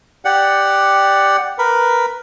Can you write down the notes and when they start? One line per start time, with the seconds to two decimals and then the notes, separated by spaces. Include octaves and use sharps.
0.25 G4 D5 F#5
1.59 A#4 B4